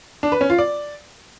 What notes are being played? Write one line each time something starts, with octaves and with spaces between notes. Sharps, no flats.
D4
B4
C#4
F4
D5